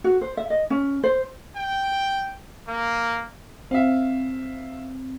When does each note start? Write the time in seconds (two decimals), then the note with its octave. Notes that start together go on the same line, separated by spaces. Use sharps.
0.04 F#4
0.21 C5
0.37 E5
0.50 D#5
0.70 C#4
1.03 C5
1.57 G5
2.68 A#3
3.71 C4 E5 F5